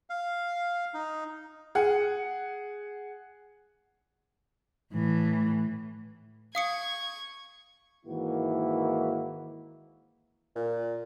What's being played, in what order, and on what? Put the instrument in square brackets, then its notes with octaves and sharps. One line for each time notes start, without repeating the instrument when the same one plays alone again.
[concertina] F5
D#4
[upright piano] G#4 F#5
[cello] A2 E3
[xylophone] F5 D#6 C#7 [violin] C#6 G#6
[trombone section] G#2 D#3 E3 A#3 E4 F#4
[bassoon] A#2